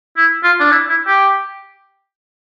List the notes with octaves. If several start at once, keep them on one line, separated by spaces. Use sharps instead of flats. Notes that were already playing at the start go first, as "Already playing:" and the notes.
E4
F4
D4
E4
E4
G4